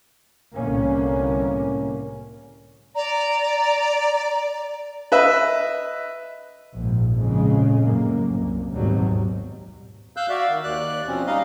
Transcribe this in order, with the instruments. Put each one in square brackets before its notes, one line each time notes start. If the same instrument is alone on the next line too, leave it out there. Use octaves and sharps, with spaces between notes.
[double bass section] C2 A2 D3 A#3 C#4
[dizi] D5 [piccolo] A#5
[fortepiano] B4 D#5 E5
[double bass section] A#1 G#2
F2 A#2 C#3 G#3
F#2 A2 A#3
C2
G#1 D#2 B2 F#3 G3
[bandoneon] F5 E6 F#6 G6
F#4 D5 E5 F5
D#3
D#2 D5 F#6
B2 F3 C4 C#4
G3 D#4 D#5 F5